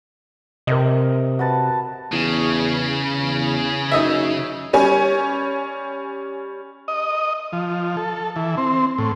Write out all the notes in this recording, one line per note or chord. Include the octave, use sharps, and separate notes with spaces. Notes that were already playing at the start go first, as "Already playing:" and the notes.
C3 A#4 D#5
F#4 B4 A5
E2 C#3
E2
F#1 D#4 D#5 E5
G3 C#4 G#5
D#5
F3
A4
E3
C4
A2